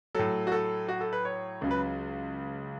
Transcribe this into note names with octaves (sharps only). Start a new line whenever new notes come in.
A2 F#3 A4
F#4
A4
F#4
A4
B4
C#5
C#2 C#3 F#3
B4